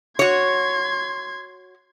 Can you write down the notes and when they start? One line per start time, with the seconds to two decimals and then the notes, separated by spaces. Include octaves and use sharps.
0.19 F#4 C#5 C6 G#6